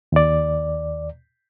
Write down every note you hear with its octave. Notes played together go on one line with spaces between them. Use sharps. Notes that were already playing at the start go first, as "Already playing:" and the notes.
D#2 D5